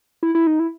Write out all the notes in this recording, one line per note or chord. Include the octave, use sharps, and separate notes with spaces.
E4
E4
D#4
E4